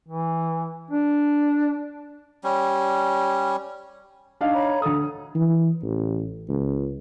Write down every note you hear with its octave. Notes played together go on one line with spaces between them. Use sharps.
E3
D4
G3 C#4
D4 D#4 F5
C#5 A#5 B5
D2 A4 D#6
E3
A1
C#2